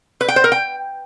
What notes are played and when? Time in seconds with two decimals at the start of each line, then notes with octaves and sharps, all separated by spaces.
0.21 B4
0.28 G5
0.36 C5
0.44 A#4
0.52 G5